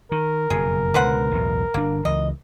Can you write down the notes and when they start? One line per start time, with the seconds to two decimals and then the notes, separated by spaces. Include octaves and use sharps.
0.12 D#3 A#4
0.50 F#1 F2 B2 G#4
0.94 C#2 B2 D3 B4 C5 F#5
1.31 B1 E2 A2
1.74 G1 A#3 D4
2.05 C#2 E3 D#5